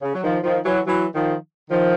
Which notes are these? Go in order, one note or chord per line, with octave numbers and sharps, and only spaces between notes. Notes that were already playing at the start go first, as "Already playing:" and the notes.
C#3
F#3
D#3 F3
D#3 F3
E3 F#3
E3 F#3
D#3 F3
D#3 F3